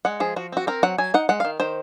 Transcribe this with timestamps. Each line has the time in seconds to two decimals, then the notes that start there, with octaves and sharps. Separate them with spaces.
0.05 G#3 F#5
0.20 F3 G#4
0.36 F3 F#4
0.52 C4 F#4
0.67 C4 A#4
0.83 F#3 F#5
0.98 F#3 G#5
1.14 D#4 F#5
1.29 G#3 F#5
1.40 F5
1.45 D#3
1.60 D#3 C5